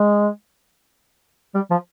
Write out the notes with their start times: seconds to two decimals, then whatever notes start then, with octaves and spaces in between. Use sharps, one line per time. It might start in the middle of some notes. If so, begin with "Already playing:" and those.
Already playing: G#3
1.54 G3
1.70 F3